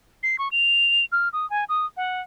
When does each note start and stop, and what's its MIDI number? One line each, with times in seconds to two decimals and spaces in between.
0.23 0.36 96
0.38 0.48 85
0.51 1.05 101
1.12 1.29 89
1.33 1.48 87
1.50 1.64 80
1.69 1.86 87
1.97 2.21 78